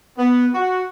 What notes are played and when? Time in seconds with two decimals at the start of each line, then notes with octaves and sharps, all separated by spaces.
0.18 B3
0.54 F#4